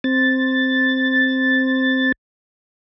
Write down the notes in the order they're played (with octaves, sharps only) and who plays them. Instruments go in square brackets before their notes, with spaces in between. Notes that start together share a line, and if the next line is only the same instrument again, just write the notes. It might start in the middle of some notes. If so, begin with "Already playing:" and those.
[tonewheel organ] C4 A6